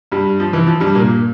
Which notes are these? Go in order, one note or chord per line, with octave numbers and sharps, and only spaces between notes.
G2 G3
F3
E3
F3
G2 G3
A#2 A#3